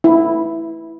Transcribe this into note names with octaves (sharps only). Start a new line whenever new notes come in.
E4